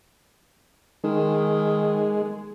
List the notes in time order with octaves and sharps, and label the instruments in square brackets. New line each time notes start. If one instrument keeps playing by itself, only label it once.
[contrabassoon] D#3 [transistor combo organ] G#3